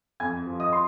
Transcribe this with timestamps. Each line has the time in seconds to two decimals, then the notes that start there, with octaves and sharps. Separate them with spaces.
0.20 F2 G#5 G#6
0.47 F3
0.60 D#5 D#6
0.73 C6